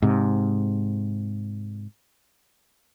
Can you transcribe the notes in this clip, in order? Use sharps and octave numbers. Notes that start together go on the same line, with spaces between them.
G#2 C3